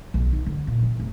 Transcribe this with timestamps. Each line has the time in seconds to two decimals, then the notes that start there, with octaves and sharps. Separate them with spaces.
0.14 B1
0.33 D#4
0.46 D3
0.67 A#2
0.82 E3
1.00 F1